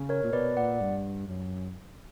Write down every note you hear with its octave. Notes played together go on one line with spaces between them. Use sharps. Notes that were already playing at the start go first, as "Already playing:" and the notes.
Already playing: C#3
A#4 C#5
A#2
B2 B4 D5
A#2 D5 F#5
G2
F#2